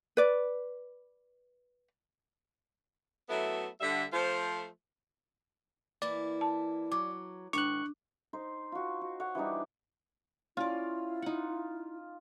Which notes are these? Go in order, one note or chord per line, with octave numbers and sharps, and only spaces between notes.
B4 D5
F#3 A3 B3 E4 A4 E5
D3 G3 E5
F3 A3 F4 C5
E3 A#3 E4 D5
A5
F#3 D6
G#2 D#3 D4 C#6 F#6
D#4 C5
F4 F#4
F#4
C#5 F#5
E3 G3 D4 D#4
C#4 E4 F4 D5
D#4 F#5